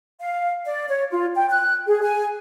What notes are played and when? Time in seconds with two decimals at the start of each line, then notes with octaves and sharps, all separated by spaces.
0.21 F5
0.65 D5
0.88 C#5
1.11 F4
1.35 G5
1.50 F#6
1.88 G#4
2.02 G#5